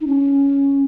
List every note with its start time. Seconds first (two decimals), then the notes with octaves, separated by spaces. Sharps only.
0.01 D#4
0.07 C#4